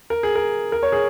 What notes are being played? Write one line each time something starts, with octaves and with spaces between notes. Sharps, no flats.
A#4
G#4
A#4
A#4
C#5
G#4